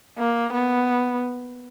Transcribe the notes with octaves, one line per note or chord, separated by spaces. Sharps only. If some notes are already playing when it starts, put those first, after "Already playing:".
A#3
B3